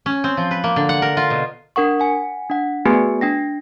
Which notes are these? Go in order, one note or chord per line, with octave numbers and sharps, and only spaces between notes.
C#4
C4
F3
B4
A#3
D3
F#5
A#4
F4
B2
D4 A#4 F#5 C#6
F#5 G#5
D4 F#5
A3 B3 F#4 G#4 B4 G#5
D4 G5 A#6